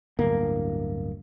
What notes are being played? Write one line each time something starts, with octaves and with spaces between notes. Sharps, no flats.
D1 G1 A#3